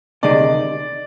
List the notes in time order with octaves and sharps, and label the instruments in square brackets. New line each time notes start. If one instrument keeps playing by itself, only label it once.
[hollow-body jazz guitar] D2 C3 D#3 G#3 D#4 [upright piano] D5